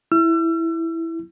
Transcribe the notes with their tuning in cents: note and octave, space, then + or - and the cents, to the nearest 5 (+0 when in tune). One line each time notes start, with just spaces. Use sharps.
E4 +0 E6 +40